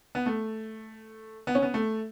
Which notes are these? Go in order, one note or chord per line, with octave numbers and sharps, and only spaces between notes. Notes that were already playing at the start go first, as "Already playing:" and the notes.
B3
A3
B3
C#4
B3
A3